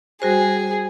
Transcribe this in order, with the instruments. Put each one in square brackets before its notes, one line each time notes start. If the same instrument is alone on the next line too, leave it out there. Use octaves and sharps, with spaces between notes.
[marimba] G3 F#4 C5 [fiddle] G#4